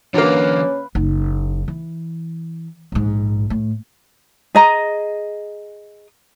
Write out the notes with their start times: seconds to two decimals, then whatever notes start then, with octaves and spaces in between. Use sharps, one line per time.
0.14 D3 E3 F#3 A#3 C#4 B4 F5 A#5
0.95 F#1 D#4
1.68 E3
2.92 A#1 G#2
3.50 A2
4.55 G#4 D#5 A#5